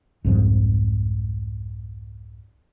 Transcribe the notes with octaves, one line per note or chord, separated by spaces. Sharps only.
C2 F2 G#2 F3